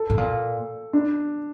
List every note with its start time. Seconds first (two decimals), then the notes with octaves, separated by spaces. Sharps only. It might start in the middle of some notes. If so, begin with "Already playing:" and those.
Already playing: A4
0.10 A2
0.18 A#2
0.93 D4